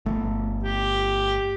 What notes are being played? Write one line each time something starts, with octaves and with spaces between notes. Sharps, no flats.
G1 A3
G4